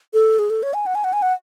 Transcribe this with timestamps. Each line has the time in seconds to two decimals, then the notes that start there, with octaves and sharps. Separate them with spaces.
0.14 A4
0.39 G#4
0.50 A4
0.63 C#5
0.74 G#5
0.86 F#5
0.95 G#5
1.04 F#5
1.13 G#5
1.22 F#5